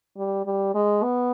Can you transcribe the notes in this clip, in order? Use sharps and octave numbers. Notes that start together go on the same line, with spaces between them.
G3
G3
G#3
B3